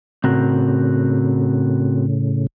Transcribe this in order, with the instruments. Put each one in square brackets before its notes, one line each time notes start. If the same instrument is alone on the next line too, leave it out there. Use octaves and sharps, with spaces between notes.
[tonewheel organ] A2 C#3 [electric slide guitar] C4 F#4 A#4